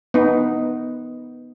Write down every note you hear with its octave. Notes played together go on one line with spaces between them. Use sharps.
B3 D#4